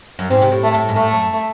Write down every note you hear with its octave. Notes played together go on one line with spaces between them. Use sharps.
F#2
G#2 C4
C3
A2
A3
A2
G#2
A2 A3
F#2